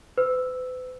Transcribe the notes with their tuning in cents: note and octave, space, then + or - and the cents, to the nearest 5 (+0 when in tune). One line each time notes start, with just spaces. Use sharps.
B4 +45 E6 +0